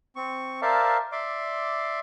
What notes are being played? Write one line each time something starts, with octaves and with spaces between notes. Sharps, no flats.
C4 C#6
A#4 C5 D5 E5 F5 A5
D5 E5 C6 D6